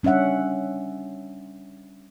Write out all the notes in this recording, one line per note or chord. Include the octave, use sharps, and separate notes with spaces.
G3 C#4 D4 E5 F#5